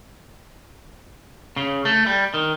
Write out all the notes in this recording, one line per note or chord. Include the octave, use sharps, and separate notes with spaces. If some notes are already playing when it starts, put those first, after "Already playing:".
C#3
A3
G3
D#3